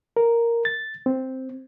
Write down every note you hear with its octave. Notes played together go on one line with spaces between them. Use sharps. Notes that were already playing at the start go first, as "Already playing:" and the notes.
A#4
A6
C4